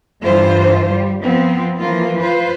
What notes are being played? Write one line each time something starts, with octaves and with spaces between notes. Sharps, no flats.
G2 D3 E3 F4 C5
G3
F3 B3 C4
E3 F3 A#3 F4
F4 B4 C5